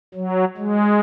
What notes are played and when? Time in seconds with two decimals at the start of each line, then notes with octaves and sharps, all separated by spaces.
0.15 F#3
0.57 G#3